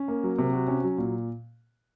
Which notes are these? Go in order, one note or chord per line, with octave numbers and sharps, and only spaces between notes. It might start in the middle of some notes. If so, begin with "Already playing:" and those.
Already playing: C#4
A#3
F#3
C3
F#4
C#4
F#3
A#2